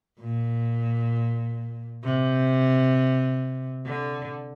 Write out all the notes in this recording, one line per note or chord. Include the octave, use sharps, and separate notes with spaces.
A#2
C3
D3